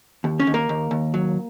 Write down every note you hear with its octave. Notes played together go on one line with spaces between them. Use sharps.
D#2
C#4 C#5
D#2
A#3 A#4
D#2
D#2
F#3